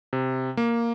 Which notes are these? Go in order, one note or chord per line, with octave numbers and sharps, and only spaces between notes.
C3
A#3